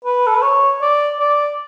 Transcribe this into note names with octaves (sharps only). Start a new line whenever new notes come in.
B4
A4
B4
C#5
D5
D5